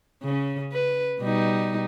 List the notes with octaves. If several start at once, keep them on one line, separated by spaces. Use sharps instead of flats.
C#3 C#4
B4
B2 G3 D#4